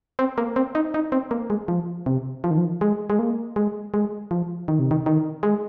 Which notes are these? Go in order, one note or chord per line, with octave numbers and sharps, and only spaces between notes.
C4
A#3
C4
D#4
D#4
C4
A#3
G#3
F3
C3
F3
D#3
F3
G#3
G#3
A#3
G#3
G#3
F3
D#3
C3
D#3
D#3
G#3